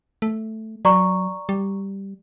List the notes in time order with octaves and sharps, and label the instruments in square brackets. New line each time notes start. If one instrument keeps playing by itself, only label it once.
[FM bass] A3
[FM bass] F#3 [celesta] D5 A#5 C#6
[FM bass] G3